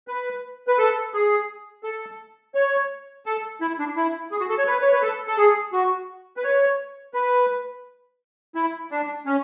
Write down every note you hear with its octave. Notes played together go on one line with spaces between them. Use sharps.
B4
B4
A4
G#4
A4
C#5
A4
E4
D4
E4
G#4
F#4
A4
C#5
B4
C#5
B4
A4
A4
G#4
F#4
B4
C#5
B4
E4
D4
C#4